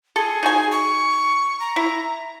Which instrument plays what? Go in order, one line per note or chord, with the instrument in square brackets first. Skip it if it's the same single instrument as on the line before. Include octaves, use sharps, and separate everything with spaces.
[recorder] G#4 [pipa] A4
[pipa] D#4 F#4 G#5
[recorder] C#6
A#5
[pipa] E4